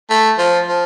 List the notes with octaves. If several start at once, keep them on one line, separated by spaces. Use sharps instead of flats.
A3
F3
F3